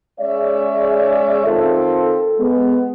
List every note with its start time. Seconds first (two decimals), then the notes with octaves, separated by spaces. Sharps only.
0.20 G#3 C#4 G#4 C#5 D5 E5
1.45 D#3 C4 F4 A4
2.39 G#3 B3